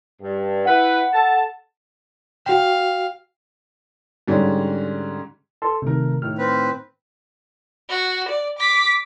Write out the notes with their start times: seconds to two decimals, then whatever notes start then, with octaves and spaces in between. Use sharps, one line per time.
0.20 G2
0.65 E4 B4 F#5
1.13 A4 A5
2.46 F#4 F5 G5
4.28 G#2 D3 G3 C#4
5.62 A4 A5 C6
5.82 C3 D#3 A3 A#4
6.22 A2 D#3 F6
6.38 C4 B4
7.89 F#4
8.28 D5
8.58 D6 B6